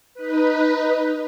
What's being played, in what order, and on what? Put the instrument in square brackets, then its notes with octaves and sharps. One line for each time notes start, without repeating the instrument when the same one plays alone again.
[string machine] D#4 B4